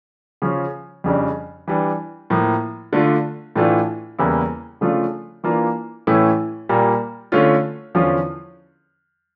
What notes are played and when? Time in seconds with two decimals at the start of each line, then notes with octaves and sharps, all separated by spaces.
0.42 C#3 F3 C#4 F4
1.04 F2 C#3 G3 D4
1.68 E3 G3 D4
2.30 A2 F3 A#3
2.93 D3 A3 D4 F4
3.56 A2 E3 A3 D4 F4
4.19 E2 C#3 G3 A#3 E4
4.81 C#3 F3 A3 D4 F4
5.44 E3 A#3 D4 F4
6.07 A2 E3 A3 C#4 E4
6.69 A#2 G3 A#3
7.32 D3 A3 C#4 F4
7.95 E2 D3 F3 C#4 F4